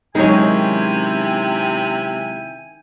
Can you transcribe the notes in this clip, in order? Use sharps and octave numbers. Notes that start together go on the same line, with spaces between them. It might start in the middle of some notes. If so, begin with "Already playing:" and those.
C3 D#3 F#3 G#3 C#4 E4 G5 G#5